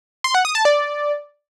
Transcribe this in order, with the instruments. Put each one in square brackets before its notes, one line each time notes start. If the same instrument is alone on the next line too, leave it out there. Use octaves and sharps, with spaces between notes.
[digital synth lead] C6
F#5
D#6
A5
D5